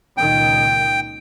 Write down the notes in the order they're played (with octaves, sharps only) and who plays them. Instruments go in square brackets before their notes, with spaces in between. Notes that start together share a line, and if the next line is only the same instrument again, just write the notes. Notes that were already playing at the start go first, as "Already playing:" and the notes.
[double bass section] C#2 A#2 D#3 [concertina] G5